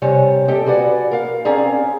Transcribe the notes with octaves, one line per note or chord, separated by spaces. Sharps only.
C3 G3 C#5 G#5
G4 A4 D#5 G5
F#4 G#4 B4 D5 F#5
A#4 F5
C4 C#4 G#4 D5 F5 A#5